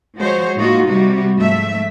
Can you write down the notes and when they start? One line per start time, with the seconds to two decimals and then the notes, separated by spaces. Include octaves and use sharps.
0.17 F3 G#3 F#4 C5 C#5
0.56 A2 A#3 D#4 F4 F#4
0.86 C3 G3 F#4
1.35 G#2 F3 A3 E5